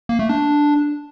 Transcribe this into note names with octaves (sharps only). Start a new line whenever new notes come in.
A#3
A3
D4